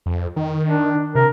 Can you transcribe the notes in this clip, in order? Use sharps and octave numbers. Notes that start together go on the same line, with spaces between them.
F2
D#3
D4
C3 A#4